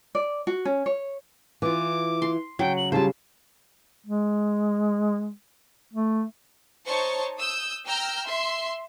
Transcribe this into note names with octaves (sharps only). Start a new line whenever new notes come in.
D5
F#4
C#4
C#5
E3 F4 D6
C6
C#3 F#3 G5
F#7
C#3 G3 E4 F4 C5 A5
G#3
A3
D#4 C5 C#5 A5 C#6
D#6 E6 G6
G5 A#5 E6 F6 G6
E5 C6